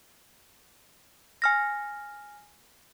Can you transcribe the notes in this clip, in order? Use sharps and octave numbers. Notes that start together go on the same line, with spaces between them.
G#5 F6 A#6